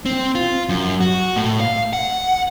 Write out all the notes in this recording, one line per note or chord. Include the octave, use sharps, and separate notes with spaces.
C4
F4
F#2
F#4
A2
F5
F#5